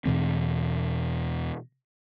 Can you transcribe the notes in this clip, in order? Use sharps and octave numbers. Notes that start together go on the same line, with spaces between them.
E2 B2 E3 C4